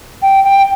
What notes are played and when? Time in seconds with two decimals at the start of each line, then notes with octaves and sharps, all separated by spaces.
0.22 G5
0.44 G5